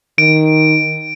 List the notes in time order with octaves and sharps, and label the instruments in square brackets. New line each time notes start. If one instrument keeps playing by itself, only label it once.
[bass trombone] D#3 [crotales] D7